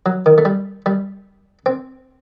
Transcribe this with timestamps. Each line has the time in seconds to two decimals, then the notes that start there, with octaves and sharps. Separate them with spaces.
0.06 F#3
0.26 D#3
0.38 A3
0.45 G3
0.86 G3
1.66 C4